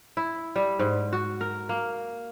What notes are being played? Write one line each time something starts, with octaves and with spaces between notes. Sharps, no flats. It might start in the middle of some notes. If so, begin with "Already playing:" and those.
E4
G3
G#2
F#4
A#4
A#3